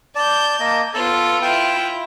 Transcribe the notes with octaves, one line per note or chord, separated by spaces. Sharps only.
D5 A5 G6
A#3 D#5
B3 F4 A4
E4 F4 G5